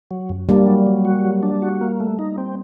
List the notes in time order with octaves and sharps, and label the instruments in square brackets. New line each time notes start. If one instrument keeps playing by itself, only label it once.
[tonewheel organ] F#3
F#2
[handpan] G3 A#3 [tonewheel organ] D4
[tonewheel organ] F#3
F#3
F#4
F#3
D4
F#4
A#3
A3
D#4
C4